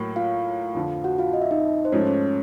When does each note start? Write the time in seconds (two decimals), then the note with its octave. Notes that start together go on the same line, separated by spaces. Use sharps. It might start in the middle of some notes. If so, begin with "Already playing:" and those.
Already playing: A2 F#3 A#3
0.16 F4 F5
0.75 F2 D3 F3
1.04 F#4 F#5
1.18 F4 F5
1.33 D#5
1.42 E5
1.51 D#4 D#5
1.85 C5
1.92 G#2 F3 A3 C#4 C#5
2.07 C#4 C#5